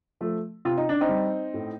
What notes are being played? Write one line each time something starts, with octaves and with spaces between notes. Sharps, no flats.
F3 A3
C3 F4
D#4
D4
C4 D#4
G3
A2